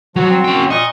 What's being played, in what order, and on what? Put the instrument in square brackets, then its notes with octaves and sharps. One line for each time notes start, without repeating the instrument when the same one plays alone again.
[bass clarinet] F3 [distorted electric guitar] F#3 [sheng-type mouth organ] F#4
[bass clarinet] C4
[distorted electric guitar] C#4 G5
[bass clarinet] A#2 [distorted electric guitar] D#5 [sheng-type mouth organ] C#6